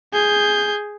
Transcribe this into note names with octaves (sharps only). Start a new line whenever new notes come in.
G#4 G6